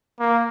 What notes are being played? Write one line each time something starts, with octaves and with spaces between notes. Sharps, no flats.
A#3